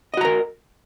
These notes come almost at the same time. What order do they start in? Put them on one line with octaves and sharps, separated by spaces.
D#5 F#4 A#5 A#4